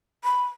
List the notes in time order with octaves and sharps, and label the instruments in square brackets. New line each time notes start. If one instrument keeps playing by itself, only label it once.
[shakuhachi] B5